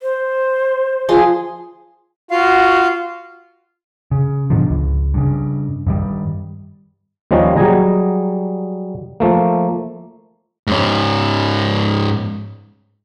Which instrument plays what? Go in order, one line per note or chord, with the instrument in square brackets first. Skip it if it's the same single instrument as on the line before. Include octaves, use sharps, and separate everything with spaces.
[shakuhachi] C5
[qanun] F3 G#4 C6
[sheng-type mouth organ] F4 F5 [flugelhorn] F#4
[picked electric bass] C#3
G#2 B2 D3 F3
C#2
G2 C#3
G2 D#3 G3
[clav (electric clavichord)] D#2 D#3 F3 G3 C#4 D#5
F#3 G3 G#4 D#5 G#5 A#5
F3 A3 A#3
[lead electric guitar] G#2 C#4